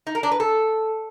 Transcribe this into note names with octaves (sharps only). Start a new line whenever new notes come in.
D#4
A#4
D4
B4
A4